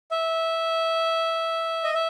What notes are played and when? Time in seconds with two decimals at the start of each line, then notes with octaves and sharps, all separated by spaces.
0.11 E5
1.84 D#5
1.94 E5